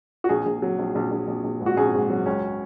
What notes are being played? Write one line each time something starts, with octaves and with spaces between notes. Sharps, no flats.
F#4
A#1 G#4
A#1
F#3
A#1
A#1
A#1
A#1
A#1
G#2
F#4
A#1 G#4
G#2
F#3
C#2 C#4